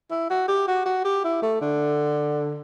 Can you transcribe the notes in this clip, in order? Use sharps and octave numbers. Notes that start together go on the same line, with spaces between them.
E4
F#4
G4
F#4
F#4
G4
E4
A3
D3